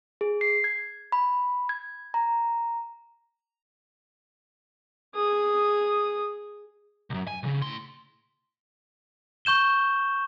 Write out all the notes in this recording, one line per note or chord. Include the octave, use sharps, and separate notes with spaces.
G#4
C7
G#6
B5
G#6
A#5
G#4 D#6
C2 F#2
G#5
B1 C#3
A2 C6
C#6 G6 E7 G7